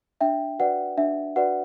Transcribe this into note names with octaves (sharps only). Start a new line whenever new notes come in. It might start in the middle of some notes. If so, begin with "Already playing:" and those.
D4 E5 G5
F#4 B4 D5 F#5
D4 E5
F#4 B4 D5 F#5